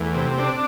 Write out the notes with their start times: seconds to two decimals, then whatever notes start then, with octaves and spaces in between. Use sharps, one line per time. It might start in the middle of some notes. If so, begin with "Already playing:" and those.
Already playing: E2 A3
0.14 C3
0.38 C4 D4